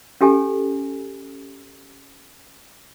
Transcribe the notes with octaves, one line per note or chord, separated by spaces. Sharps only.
C#4 G4 A4 G#5